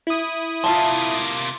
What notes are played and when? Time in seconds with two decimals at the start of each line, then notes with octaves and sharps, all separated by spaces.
0.07 E4 D#6
0.64 C3 A#3 F4 E5 A5